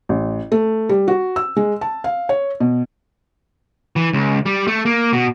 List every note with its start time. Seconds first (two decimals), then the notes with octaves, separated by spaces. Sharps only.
0.09 A1
0.52 A3
0.89 G3
1.08 F#4
1.36 E6
1.57 G#3
1.81 A5
2.04 F5
2.29 C#5
2.60 B2
3.96 E3
4.13 C#2
4.46 G3
4.67 A3
4.85 A#3
5.13 B2